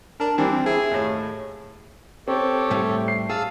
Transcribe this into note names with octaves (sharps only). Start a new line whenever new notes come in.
D4 A#4
E3 G3 C4 D4
E4 G#4
D#2 A2
C4 G4 A4 C#5
A2 G3 A3
C7
G#4 F5 A5 E6